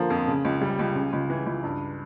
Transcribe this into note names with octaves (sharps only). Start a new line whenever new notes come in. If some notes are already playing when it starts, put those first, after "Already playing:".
Already playing: D3 F3 A#3
F2
C#3
C#2
G3
C#2
C#3
C#2
E3
C#2
G2